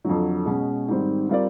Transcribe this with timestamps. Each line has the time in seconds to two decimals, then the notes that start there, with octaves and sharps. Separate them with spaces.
0.04 F2 D3 F#3
0.46 B2 G#3 C#4
0.88 G#2 D#3 G3 C4
1.29 G3 C4 F4 A#4 D5